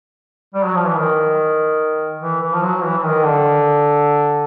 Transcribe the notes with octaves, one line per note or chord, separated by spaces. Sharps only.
G3
F#3
F3
E3
D#3
E3
E3
F3
F#3
E3
E3
D#3
D3